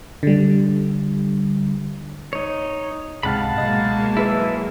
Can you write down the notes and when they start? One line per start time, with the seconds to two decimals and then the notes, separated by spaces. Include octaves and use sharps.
0.23 D3 G3
2.33 D#4 C#5
3.23 C#2 G#2 C3 F5 F#5 A5 B5
3.57 B2 F#3 G#3 A#3 D#5
4.17 E4 B4 E5